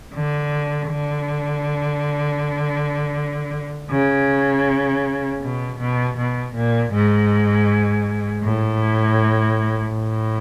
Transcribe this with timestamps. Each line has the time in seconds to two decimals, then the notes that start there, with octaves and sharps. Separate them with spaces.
0.14 D3
0.89 D3
3.91 C#3
5.42 B2
5.79 B2
6.17 B2
6.54 A#2
6.92 G#2
8.43 A2
9.94 A2